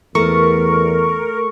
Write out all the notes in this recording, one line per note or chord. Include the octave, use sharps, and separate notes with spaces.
E2 A3 A#4 C#6